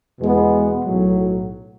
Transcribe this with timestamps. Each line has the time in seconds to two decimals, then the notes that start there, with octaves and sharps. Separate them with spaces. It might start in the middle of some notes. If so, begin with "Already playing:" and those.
0.19 E2 B2 G#3 B3
0.85 B1 A2 F#3